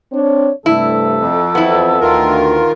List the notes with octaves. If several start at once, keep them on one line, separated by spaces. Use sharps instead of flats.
C4 D4 C#5
G2 C3 A3 E4 A4
F2
E2 F3 B3 C4 E4
D2 D#3 F4 A#4